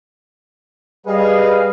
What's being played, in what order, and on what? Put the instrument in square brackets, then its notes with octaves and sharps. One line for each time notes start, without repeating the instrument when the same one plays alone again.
[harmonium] G3 G#4 [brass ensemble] B4 D#5 F5